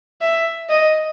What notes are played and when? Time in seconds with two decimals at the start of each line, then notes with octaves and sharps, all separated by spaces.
0.21 E5
0.69 D#5